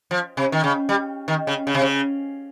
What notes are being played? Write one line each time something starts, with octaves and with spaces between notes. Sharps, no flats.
F3
C3
D#3
C#3
G3
D#3
C#3
C#3
C3
C#3